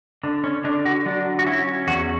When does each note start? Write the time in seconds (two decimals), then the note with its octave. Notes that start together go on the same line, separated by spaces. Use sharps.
0.23 D3 D4
0.44 C#4
0.64 D3 D4
0.85 F#4
1.06 F#3 D4
1.39 F#4
1.46 C#4 E4
1.87 E2 F#4